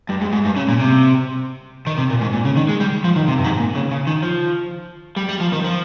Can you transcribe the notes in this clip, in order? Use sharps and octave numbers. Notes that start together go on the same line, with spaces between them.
G2
G#2
G#2
G2
C#3
A#2
C3
D#3
C3
A#2
G#2
A#2
C#3
D#3
G#3
G3
F3
D#3
C3
G2
G#2
A#2
C#3
C#3
D#3
F3
G3
G3
F3
D#3
F3